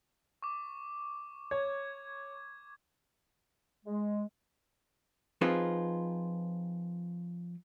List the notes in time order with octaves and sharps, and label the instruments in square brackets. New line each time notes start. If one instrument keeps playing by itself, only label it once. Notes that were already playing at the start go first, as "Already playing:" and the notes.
[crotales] C#6 D6
[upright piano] C#5 [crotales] G#6
[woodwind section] G#3
[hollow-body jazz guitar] F3 C4 D#4 F4 G#4 B4